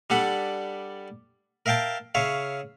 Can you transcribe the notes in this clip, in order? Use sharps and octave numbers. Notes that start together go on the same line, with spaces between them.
G3 D4 A4 F#5 B5
A#4 E5 F5 G5 A5
C#3 C#5 E5 F5